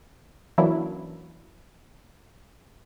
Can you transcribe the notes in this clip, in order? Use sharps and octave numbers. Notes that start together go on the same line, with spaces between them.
E3 F#3 A#3 C#4 D4 E4